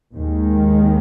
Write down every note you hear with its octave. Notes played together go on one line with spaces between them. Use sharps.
D#2 D#3 G#3